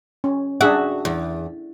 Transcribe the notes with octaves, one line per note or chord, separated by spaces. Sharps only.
C#4
D4 F#4 G#4 E5
E2